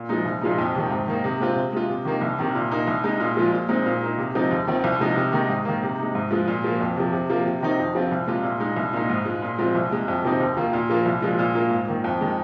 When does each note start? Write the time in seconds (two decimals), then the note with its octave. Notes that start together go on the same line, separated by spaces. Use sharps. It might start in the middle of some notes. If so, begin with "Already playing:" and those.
Already playing: A#2
0.09 F3 G#3 D#4
0.25 C2
0.41 A#2 F3 G#3 D#4
0.58 F2
0.75 C3 D#3
0.91 G#2
1.07 D#3 A#3 D#4
1.24 C3
1.40 G#3 C4 F4
1.56 C3
1.73 G#3 F4
1.90 C3
2.05 D#3 A#3 D#4
2.21 C2
2.39 C3 D#3
2.55 A#2
2.71 A#3 D#4
2.87 C2
3.04 C3 G#3 D#4
3.20 A#2
3.37 F3 G#3 F4
3.52 A#2
3.69 G#3 C4 D#4
3.86 A#2
4.02 A#3 D#4
4.18 C3
4.35 F3 G#3 C4 D#4
4.51 D#2
4.67 D#3 C4 F4
4.84 C2
5.00 C3 F3 G#3 D#4
5.16 C3
5.32 D#3 G#3 D#4
5.49 G#2
5.65 D#3 A#3
5.83 C3
5.98 G#3 D#4
6.15 G#2
6.31 F3 G#3 F4
6.48 A#2
6.64 F3 A#3
6.80 F2
6.96 C3 F3
7.13 C3
7.30 F3 A#3 F4
7.46 C3
7.63 D#3 C4 D#4
7.79 F2
7.95 F3 C4 F4
8.11 C2
8.27 C3 G#3 F4
8.43 A#2
8.60 G#3 D#4
8.76 C2
8.93 A#2 A#3 D#4
9.10 G#2
9.25 G#3 F4
9.42 A#2
9.58 F3 G#3 C4 F4
9.75 C2
9.91 C3 G#3
10.08 F2
10.24 C3 F3 C4 D#4
10.40 D#2
10.57 D#3 A#3 F4
10.73 A#2
10.90 F3 A#3 F4
11.06 C2
11.22 A#2 F3 G#3 F4
11.39 A#2
11.55 A#3 F4
11.71 G#2
11.87 D#3 A#3
12.04 F2
12.21 D#3 G#3